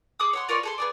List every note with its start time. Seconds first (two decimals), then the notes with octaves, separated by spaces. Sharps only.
0.20 G#4 D6 D#6
0.33 C#5 F#5 C6
0.49 F4 A#4 C#5 D5
0.63 G#4 A4 C6
0.78 B3 G#4 D5